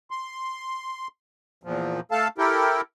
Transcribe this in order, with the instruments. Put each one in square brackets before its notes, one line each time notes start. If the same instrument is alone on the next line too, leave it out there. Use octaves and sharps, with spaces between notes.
[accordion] C6
E2 A#2 F3
A3 A4 F5 A5
E4 G4 A4 A#4 G5